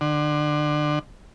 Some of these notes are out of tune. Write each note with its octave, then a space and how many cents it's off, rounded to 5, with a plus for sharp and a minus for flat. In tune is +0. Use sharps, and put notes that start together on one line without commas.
D3 +25